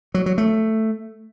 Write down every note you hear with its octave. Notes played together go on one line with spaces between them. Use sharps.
F#3
F#3
A3